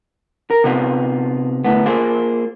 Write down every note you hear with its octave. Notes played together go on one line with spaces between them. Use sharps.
A#4
C3 B3 D#4 F4
D2 A2 B3
A#3 F4 G#4 C5